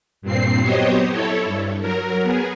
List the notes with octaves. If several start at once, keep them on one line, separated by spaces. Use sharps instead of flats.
G2 A#2 C4 C7
F#3 B3 G4 C5 C#5 D#5
E4 A4 C#5
G2
F#3 A#4
B3 G#4